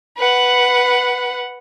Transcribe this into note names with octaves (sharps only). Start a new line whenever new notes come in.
B4 F#5